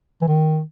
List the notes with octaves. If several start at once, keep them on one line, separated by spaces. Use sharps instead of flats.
E3
D#3